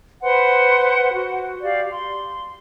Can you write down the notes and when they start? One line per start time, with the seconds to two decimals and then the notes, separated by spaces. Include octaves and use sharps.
0.23 B4 C5 F#5 C6
1.13 F#4
1.62 G4 D5 F5
1.92 C6